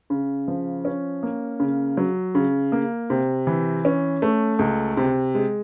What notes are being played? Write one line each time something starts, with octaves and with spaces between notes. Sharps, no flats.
C#3
F3
C#4
A#3
C#3
F#3
C#3
A#3
C3
E3
C#4
A3
C#2
C3
G#3